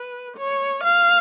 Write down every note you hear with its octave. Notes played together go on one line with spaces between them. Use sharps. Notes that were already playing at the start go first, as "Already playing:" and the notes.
Already playing: B4
C#5
F5